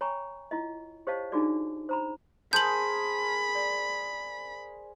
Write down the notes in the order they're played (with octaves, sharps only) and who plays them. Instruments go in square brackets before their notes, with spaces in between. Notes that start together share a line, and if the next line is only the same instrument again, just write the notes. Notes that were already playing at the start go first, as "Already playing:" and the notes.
[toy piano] C#5 G5 G#5 A#5 B5 C#6
E4 F4 D#5
G4 C5 C#5 D#5 F5 A5
D4 D#4 F4 F#4 G#4 D5
C5 A#5 B5
[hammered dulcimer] G#4 A#4 C5 [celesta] A5 C6 [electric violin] B5 [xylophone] G6 F#7
[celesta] D5